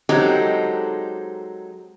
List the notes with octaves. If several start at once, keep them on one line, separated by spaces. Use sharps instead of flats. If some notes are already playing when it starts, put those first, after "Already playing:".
F#3 G#3 C4 D#4 G4 A4